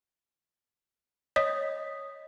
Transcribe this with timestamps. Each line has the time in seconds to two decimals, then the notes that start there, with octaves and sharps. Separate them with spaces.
1.36 C#5 D#5 D#6 B6